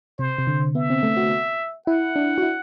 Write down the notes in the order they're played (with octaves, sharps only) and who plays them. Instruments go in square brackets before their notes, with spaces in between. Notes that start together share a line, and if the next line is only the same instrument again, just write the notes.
[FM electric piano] C3 [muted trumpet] C5
[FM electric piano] C3
D3
[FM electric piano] B3 [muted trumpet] E5
[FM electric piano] C4
A3
F#4
[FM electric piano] E4 [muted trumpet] F#5
[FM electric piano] D4
F#4
E4